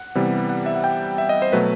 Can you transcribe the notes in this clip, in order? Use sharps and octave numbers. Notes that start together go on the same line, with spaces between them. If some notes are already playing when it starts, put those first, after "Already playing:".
Already playing: F#5
C3 E3 G3 B3
F#5
E5
F#5
G5
E5
D#5
C5
B2 F#3 A3 B4